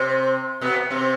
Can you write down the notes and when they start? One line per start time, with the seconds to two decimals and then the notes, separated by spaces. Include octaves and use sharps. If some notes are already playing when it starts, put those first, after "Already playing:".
Already playing: C3 C4
0.61 B2 B3
0.90 C3 C4